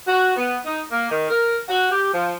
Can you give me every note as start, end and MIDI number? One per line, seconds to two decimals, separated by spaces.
0.07 0.34 66
0.36 0.59 59
0.66 0.82 63
0.91 1.07 58
1.10 1.27 51
1.29 1.58 70
1.69 1.87 66
1.91 2.11 67
2.13 2.35 53